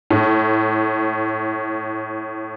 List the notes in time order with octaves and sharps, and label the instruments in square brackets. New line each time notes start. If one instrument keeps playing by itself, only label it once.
[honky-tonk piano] A2